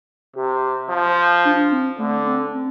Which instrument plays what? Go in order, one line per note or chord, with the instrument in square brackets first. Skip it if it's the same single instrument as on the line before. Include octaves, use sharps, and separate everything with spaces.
[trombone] C3 [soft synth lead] G4
[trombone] F3
[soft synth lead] D4
C4
[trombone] D3 [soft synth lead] A3
[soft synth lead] C4
C4